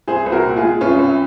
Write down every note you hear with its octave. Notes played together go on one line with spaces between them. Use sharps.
C2 G#4 C5
C2
F#4 A#4
A#2
F4 G#4
G#3
C2 C#4 F4
C2